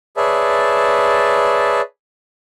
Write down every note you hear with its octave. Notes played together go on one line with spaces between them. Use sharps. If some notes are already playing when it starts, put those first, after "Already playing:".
G#4 B4 C#5 D5 E5 A5